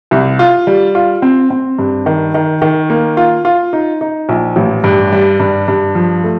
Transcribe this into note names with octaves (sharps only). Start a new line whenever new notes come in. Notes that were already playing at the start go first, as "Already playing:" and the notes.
C2
F4
G3
F4
C4
C4
G2
D#3
D#3
D#3
A#3
F4
F4
D#4
D#4
A#1
A1
G2
G3
G2
G2
F3
A3